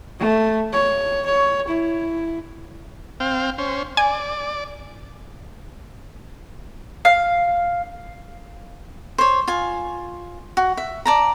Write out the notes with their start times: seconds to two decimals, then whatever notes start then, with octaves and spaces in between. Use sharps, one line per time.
0.19 A3
0.72 C#5
1.26 C#5
1.68 E4
3.20 C4 F5 G5
3.58 C#4 C5
3.97 D5 G#5
7.05 F5
9.18 C5 C#5
9.48 F4 G#5
10.57 F#4
10.77 E5
11.05 D5 A5 A#5